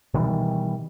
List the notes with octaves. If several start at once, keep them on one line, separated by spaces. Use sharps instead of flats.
B2 D#3 E3 G3